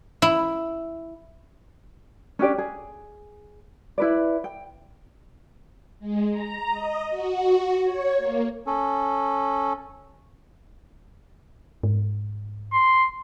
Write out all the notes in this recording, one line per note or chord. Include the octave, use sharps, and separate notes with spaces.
E4
C#4 D4 G4 D5
G#4
E4 B4 D5
G5
G#3
A#5
D#5
F#4
C#5
A#3
C#4 A4
G#2
C6